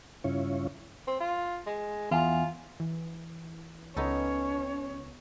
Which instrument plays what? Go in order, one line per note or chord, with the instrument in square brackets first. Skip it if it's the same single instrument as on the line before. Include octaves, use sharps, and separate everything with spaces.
[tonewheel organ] G2 C#3 C#4 E4 F4 C#5
[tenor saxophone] C4
F4
G#3
[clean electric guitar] E2 [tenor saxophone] F4
[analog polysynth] E3
[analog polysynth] C#2 [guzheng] B3 D#4 A4 [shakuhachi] C#4 [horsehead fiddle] C#5